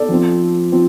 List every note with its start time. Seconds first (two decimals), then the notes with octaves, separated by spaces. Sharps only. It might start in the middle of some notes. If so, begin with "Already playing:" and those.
Already playing: A4 D5
0.09 F2 F3 C4
0.72 F3 C4